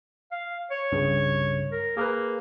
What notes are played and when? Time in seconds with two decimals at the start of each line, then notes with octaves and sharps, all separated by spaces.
0.32 F5
0.71 C#5
0.92 C2 G2 C#3
1.72 A#4
1.97 A#3 G#4 A#4 B4